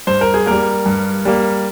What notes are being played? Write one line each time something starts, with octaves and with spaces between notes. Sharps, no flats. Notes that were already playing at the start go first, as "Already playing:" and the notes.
G2 C5
A#4
G#4
G3 A#3 A#4
G2
G3 A#3